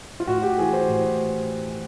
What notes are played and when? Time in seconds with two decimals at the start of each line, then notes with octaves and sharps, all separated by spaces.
0.20 F4
0.27 A2 F#4
0.43 G4
0.58 E3 G#4
0.73 C5
0.88 A2